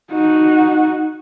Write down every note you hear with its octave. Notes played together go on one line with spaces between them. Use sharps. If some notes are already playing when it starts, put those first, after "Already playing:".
D#4 F#4